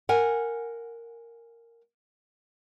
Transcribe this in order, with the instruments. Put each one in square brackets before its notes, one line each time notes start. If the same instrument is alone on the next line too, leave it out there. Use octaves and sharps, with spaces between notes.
[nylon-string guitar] A#4 F#5 G#5